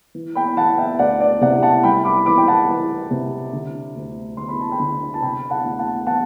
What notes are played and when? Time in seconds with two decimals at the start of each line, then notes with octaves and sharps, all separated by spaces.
0.15 E3
0.35 G5 B5
0.57 E3 F#5 A5
0.77 E5 G5
0.99 D2 D5 F#5
1.20 D5
1.41 C3 D5 F#5
1.62 F#5 A5
1.83 C2 G5 B5
2.05 B5 D6
2.26 E3 B5 D6
2.37 G5
2.47 F#5 A5
2.69 E3
3.11 C3
3.53 D3
3.95 D2
4.37 D3 C6
4.48 B5
4.61 A5
4.71 G5 B5
4.79 D3
5.14 A5
5.22 C3 G5 B5
5.50 F#5 A5
5.64 D2
5.79 F#5 A5
6.07 E3 F#5 A5